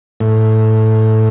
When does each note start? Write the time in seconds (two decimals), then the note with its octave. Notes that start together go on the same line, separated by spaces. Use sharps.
0.20 A2